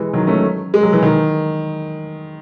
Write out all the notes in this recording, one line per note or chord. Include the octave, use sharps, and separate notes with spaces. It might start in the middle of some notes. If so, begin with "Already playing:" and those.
Already playing: E3 G#3
D#3 F#3
A3 C#4
G#3
F#3
E3
D#3